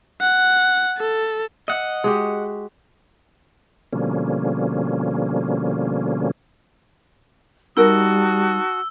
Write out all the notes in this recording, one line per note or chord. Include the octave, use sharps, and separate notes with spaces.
F#5
A4
D#5 E5 F#5
G#3 F#4 G4
B2 D3 F3 G3 A#3 C#4
G3 D#4 F#4 A#4 A5 D#6 E6